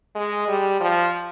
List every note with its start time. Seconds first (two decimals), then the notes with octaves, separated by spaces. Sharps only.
0.15 G#3
0.48 G3
0.81 F3